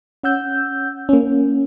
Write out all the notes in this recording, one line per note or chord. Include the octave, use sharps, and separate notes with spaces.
C#4 F#5 E6 G6
A#3 C#4